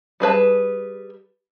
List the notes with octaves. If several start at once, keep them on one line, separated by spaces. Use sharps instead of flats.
G3 G#4 B4 A5